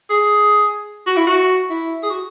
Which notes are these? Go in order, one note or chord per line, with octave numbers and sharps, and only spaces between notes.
G#4
F#4
E4
F#4
E4
G#4
F#4